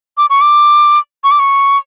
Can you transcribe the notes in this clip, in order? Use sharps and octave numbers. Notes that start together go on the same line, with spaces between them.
D6
C#6
D6
C#6
D6
C#6